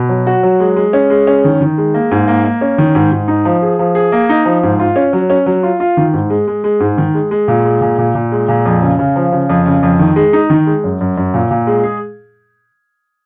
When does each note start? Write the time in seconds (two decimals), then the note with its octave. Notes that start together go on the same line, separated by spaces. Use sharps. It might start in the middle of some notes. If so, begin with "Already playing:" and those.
Already playing: B2
0.09 F#3
0.27 F#4
0.43 F#3
0.60 G#3
0.76 G#3
0.93 C#4
1.10 G#3
1.27 C#4
1.44 D#3
1.61 D#3
1.78 G#3
1.94 A#3
2.11 G#2
2.28 A#3
2.45 A#3
2.61 C#4
2.78 D#3
2.95 G#2
3.11 G#2
3.28 D#4
3.45 F3
3.62 G#4
3.79 F3
3.95 G#4
4.12 A#3
4.29 D#4
4.45 F3
4.63 G#2
4.80 F4
4.96 C#4
5.13 F#3
5.30 C#4
5.46 F#3
5.63 F4
5.80 F4
5.97 D#3
6.13 G#2
6.30 G#3
6.48 G#3
6.64 G#3
6.80 G#2
6.98 D#3
7.14 G#3
7.31 G#3
7.48 A#2
7.65 G#3
7.81 A#2
7.98 A#2
8.15 A#2
8.32 G#3
8.48 A#2
8.66 F2
8.82 C#3
8.99 C#3
9.16 F3
9.32 C#3
9.50 F2
9.66 C#3
9.83 F2
10.00 D#3
10.16 G#3
10.33 D#4
10.50 D#3
10.67 G#3
10.84 F#2
11.01 F#2
11.17 F#2
11.34 A#2
11.51 A#2
11.67 G#3
11.84 G#4